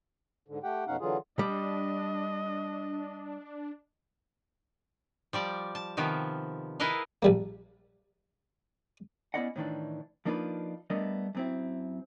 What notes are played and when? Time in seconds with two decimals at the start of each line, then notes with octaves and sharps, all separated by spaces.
0.48 G#2 D3
0.63 A3 G4 F#5 G5
0.87 F2 B2 C#4 D#4 F5 F#5
1.00 D3 E3 F#3 F4 G#4
1.39 G3 D4 D#5
5.33 F3 G3 D5
5.75 A5
5.97 C3 D#3 F3 B3
6.80 E4 G#4 A#4 B4 D#5 F5
7.22 A#1 G3 A#3
9.34 B3 C#4 E4 D5 D#5 F#5
9.56 A2 D#3 E3 D4
10.25 F3 A#3 D4 D#4 F4 B4
10.90 G3 A3 B3 D4 A#4 D#5
11.35 F#2 C4 E4